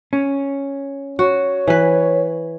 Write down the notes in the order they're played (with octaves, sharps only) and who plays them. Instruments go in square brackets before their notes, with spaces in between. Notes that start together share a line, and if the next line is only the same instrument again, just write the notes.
[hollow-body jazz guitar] C#4
[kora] F#4 [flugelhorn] C#5
[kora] E3 B4